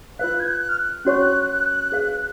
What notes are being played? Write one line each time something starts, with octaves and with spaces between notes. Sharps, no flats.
F4 B4 F5 F#6
G#6
F#6
F6
F#6
C#4 F#4 C#5 F#5 C#6
G#4 B4 F5